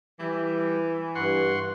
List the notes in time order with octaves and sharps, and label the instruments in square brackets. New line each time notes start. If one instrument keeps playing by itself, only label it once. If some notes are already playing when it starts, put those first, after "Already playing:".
[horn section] E3 [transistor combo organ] G3
[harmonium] G2 [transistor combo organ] F#5 C6 C#6